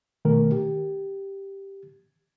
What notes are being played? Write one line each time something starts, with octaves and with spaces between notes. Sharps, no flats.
B2 D#3 A3 A#4
G4